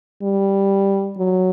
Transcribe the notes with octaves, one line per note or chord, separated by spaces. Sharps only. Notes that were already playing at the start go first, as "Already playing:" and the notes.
G3
F#3